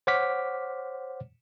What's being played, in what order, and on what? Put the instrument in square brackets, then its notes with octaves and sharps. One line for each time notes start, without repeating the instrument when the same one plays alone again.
[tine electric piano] C5 C#5 F#5 D6 F6 B6